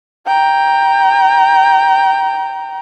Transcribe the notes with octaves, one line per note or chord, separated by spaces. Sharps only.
G5 A#5